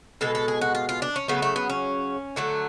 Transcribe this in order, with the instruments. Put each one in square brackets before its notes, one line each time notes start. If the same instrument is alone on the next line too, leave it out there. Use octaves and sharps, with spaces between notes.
[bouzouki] B2 G#3 A4
A4
G#4
F#4
F4
F4
D4
C#4
C#3 F#3 A3 B3
A3
B3
C#4
D3 F#3 A3